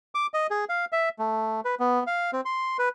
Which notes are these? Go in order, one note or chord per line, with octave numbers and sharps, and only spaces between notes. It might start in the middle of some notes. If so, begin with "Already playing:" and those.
D6
D#5
G#4
F5
E5
A3
B4
B3
F5
C4
C6
B4